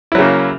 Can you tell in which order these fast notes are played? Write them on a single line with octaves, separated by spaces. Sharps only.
E4 F#3 C#3 A#3